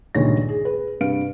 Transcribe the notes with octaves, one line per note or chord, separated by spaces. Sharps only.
C#2 G2 A#2 D#3 C#5 A#6
G#4
G#4 B4
G2 C3 B4 F5 D7